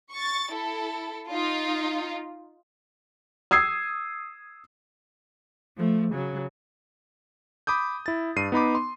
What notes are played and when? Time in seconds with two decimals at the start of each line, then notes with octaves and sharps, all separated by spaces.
0.12 C#6 A6
0.52 E4 A4
1.30 D#4 F4
3.51 D#6 E6 G#6 C7
5.77 F3 A3
6.13 C#3 F#3
7.67 B5 D6 D#6 G6
8.06 E4 A6
8.36 G2 C7 D#7
8.52 B3 D#4 B5 D6
8.75 C6